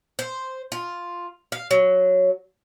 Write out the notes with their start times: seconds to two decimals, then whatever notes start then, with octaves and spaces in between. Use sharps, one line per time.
0.19 C5
0.72 F4
1.52 F5
1.71 F#3